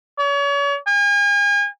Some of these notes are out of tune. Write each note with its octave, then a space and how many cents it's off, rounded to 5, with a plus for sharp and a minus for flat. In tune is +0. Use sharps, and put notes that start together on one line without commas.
C#5 +40
G#5 -40